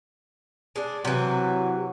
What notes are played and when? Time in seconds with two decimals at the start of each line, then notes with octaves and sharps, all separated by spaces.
0.76 G#3 D4
1.05 C3 E3 F#3